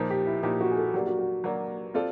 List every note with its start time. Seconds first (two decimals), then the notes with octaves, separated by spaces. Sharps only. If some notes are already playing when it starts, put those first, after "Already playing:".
Already playing: A#2 F3 A#3 D#4
0.10 G4
0.27 E4
0.43 A#2 F3 A#3 D#4 G4
0.61 F#4
0.71 G#4
0.77 A4
0.94 F#3 A#3 D4 G4
1.07 F#4
1.19 F#4
1.44 F#3 A#3 D4
1.94 C4 F4 A4 D5